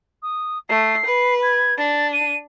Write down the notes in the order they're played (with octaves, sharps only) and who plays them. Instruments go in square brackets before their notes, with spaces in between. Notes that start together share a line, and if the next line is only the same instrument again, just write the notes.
[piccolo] D#6
[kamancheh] A3 [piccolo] C7
[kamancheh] B4
[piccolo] G#6
[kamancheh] D4 [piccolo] A6
[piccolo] D#7